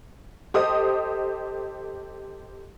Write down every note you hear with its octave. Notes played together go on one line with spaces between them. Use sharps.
G4 A4 C5 D#5 D#6